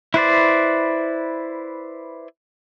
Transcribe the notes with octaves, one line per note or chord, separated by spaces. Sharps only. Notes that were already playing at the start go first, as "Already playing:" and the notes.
E4 B4 C5 D5